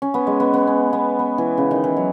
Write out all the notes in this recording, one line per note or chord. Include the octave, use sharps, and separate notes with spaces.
C#4
B3
G#3
B3
B3
C#4
B3
B3
E3
C#3
D#3
E3
F#3